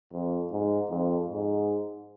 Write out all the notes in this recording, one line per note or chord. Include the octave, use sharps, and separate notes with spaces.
F2
G#2
F2
G#2